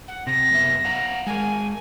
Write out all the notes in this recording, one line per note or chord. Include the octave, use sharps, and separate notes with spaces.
F#5
C3 A#6
F#2 B3 E5
F5 F#5 A#5
G#3 A#4 G#5